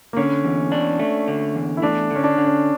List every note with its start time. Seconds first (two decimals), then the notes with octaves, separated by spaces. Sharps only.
0.13 A#3
0.17 D3 C#4
0.45 E2
0.72 D4
0.99 A3
1.28 D3
1.55 E2
1.77 E4
1.82 A3 D4
2.11 D3 C#4
2.24 D4
2.38 D3
2.45 C#4